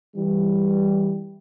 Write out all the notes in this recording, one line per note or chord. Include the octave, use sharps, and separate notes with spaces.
E3 G3